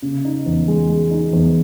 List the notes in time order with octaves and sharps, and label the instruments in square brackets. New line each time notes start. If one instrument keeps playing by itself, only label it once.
[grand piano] C#3
D#4
E2
G#3
G#3
D#4
E2